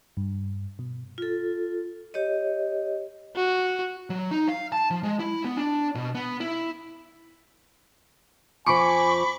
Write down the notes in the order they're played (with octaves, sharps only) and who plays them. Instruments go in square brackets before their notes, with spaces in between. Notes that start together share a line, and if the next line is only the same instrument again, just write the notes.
[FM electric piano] G2
B2
[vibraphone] F4 A4
G4 C#5 D#5
[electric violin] F#4
[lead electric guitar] F#3
D#4
F5
A5
F3
G#3
E4
B3
D4
B2
B3
E4
[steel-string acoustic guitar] F2 F3 [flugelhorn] G#5 [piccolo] B5 [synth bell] C#6 D6